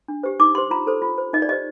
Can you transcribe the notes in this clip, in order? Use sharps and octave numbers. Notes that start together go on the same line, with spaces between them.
D4
G4 C5
D#4 D6
G4 C5 C6
F4 A#5
A4 C5
F4
C5
D#4 D#5
D5
G4 C5 D#5